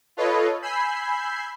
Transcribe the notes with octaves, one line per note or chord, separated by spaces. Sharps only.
F4 A4 B4 C#5 D#5
G#5 B5 E6 G6 C7